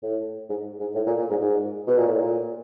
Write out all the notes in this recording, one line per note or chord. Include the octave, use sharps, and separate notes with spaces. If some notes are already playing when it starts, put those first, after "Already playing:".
A2
G#2
G#2
A2
A#2
A#2
G#2
G#2
B2
A#2
A2
A#2